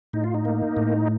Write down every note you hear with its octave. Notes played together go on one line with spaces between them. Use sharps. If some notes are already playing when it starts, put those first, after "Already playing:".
A2 D#4
F4
D#4
A#3
A2